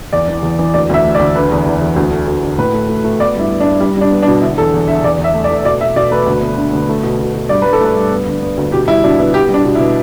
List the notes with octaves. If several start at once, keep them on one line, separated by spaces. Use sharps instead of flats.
E2 D5
E3
E2
E3
D2 D5
D2 E5
A3
D5
D2
D3 B4
E2
E2
E2
D2
A3
D2
D3
A2 B4
A3
A3
A3
B3 D5
G2 E4
B3
D4
G2
G3
G3 D4
B3
D4
B2
D3 E4
E2 A4
E2
D3 E5
E2 D5
E2
E5
A3
D5
A3
B2 D5
B2 E5
B2 D5
A3 B4
D2
B3
D3
D2
A3
B2
B2
B2
G2 D5
G2 B4
A4
A3 B4
G2
B3
D3
B3
D2
B2 G4
G3 E4
B2 D4
B3 E4
B3 G4
G3
D4
B2
E4
B2